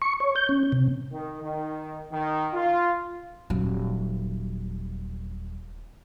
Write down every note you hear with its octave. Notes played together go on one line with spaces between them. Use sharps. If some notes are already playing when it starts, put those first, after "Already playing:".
C#6
C#5
G6
C#4
C3
D#3
D#3
D#3
F4
D#1 F#3